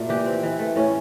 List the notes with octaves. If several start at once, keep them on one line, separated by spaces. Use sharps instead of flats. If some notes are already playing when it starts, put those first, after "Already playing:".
Already playing: A#2 A3
E3 G4
C4
E3
A3
A2 C#4